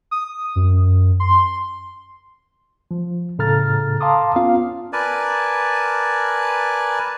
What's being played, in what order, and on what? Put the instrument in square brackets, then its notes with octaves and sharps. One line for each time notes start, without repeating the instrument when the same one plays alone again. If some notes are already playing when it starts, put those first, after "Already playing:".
[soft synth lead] D#6
F#2
C6
[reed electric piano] F3
A2 C#3 A4 A#5 F6 A6
F5 A5 A#5 C6 D6 D#6
B3 C#4 F4 F5
[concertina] A#4 B4 D5 G#5 A5